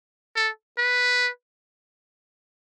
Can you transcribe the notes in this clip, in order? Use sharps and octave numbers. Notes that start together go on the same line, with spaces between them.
A4
B4